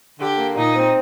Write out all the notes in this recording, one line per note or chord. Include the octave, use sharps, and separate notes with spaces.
D3 G4
A#3
A#2 D#4
C4